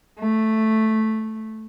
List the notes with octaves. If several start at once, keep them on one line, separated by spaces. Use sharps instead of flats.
A3